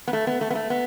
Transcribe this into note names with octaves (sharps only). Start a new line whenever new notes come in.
B3
A3
B3
A3
B3
A3
B3